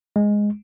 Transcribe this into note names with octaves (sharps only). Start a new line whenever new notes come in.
G#3